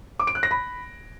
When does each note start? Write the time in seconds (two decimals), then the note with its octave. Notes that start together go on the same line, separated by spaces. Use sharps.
0.20 D6
0.27 D7
0.35 F#6
0.43 A#6
0.51 B5